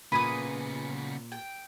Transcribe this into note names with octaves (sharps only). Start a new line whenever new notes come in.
A#2 C#3 B3 B4 G#5 B5 D#6
G5